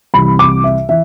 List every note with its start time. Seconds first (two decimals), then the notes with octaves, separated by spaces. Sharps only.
0.14 C2 C3 E3 B5
0.39 D6
0.64 E5
0.89 E3 E5